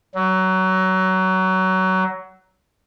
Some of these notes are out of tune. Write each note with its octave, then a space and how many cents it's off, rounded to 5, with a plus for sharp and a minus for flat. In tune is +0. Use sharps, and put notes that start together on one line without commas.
F#3 +20